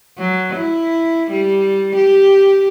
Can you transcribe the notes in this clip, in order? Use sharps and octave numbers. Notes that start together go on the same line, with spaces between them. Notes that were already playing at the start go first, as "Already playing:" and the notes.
F#3
E4
G3
G4